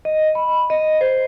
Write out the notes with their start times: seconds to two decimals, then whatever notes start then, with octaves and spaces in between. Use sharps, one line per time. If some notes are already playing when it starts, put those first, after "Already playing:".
0.05 D#5
0.35 B5
0.70 D#5
1.01 C5